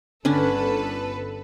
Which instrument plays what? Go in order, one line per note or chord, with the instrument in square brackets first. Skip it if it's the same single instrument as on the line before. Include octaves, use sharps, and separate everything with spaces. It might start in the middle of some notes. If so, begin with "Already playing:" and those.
[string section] G1 A4 B4 [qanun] D3 C#4 D4